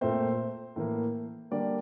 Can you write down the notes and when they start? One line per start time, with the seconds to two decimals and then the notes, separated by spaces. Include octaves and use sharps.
0.01 A#2 A3 C4 C5
0.76 A2 E3 A#3
1.51 D3 G3 A#3 D5